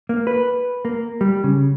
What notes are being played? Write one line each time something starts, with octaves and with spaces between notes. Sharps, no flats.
A#3
B4
A#3
G3
C#3